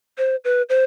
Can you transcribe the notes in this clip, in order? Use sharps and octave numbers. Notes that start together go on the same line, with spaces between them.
C5
B4
C5